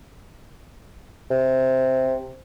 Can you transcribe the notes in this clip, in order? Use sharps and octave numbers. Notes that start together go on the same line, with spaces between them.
C3